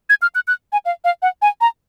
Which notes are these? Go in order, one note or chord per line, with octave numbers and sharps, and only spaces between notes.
G#6
F6
F#6
F#6
G#5
F5
F5
F#5
G#5
A#5